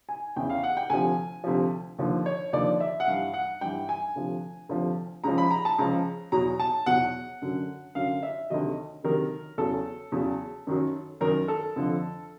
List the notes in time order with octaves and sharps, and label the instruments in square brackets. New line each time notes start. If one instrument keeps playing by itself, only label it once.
[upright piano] G#5
E2 C#3 E3 G5
F5
F#5
G5
D2 C3 F3 G#5
D2 C3 F3
D#2 D3 F3
C#5
D#2 D3 F3 D5
E5
F#5
G2 E3 F5
F#5
G2 E3 G5
G#5
D2 C3 F3
D2 C3 F3
C#2 C#3 F3 A#5
B5
A#5
A5
C#2 C#3 F3 A#5
E2 B2 F#3 A#5
A5
E2 B2 F#3 F#5
F#2 D3 F#3
F#2 D3 F#3 F5
E5
D2 C3 D#3 F#3 D#5
D2 C3 D#3 F#3 A#4
E2 C#3 F#3 A4
E2 C#3 F#3
F#2 D#3 F#3
F#2 D#3 F#3 A#4
A4
F2 D3 F3